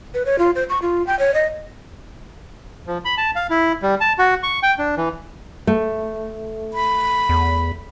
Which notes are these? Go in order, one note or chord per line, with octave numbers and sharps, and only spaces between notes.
B4
C#5
F4
C5
C#6
F4
G5
C#5
D#5
F3
B5
A5
F5
E4
G3
A5
F#4
C#6
G5
D4
E3
A3
B5
E2